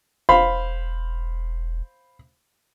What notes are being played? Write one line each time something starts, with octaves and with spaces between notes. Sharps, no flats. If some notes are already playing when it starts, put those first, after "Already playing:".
E1 C5 F5 B5